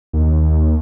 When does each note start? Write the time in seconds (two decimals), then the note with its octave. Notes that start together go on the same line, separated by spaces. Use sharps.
0.13 D#2